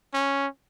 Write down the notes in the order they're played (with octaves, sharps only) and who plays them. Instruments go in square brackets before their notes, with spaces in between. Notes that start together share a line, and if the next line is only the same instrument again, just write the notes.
[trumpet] C#4